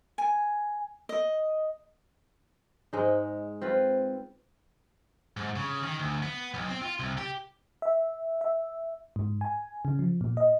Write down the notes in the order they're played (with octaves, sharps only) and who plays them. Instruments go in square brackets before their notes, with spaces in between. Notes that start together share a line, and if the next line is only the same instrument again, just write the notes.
[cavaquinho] G#5
D#5
[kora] G#2 G#3 D#4
C4 F4 B4
[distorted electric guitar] G#2
C#3
D#3
D2
B3
B1
C4
F4
C2
G4
[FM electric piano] E5
E5
G#2
G#5
C#3
F3
A#2
D#5